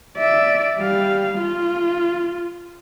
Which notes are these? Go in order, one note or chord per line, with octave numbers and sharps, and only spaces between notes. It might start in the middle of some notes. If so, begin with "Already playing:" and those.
D5 E5
G3 F5
F4